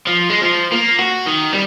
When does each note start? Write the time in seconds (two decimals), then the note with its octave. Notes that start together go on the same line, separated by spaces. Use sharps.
0.07 F3
0.30 G#3
0.42 F3
0.72 A#3
0.99 F#4
1.26 D#3
1.53 G3